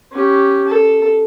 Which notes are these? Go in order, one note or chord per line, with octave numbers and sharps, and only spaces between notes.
C#4 G4
A4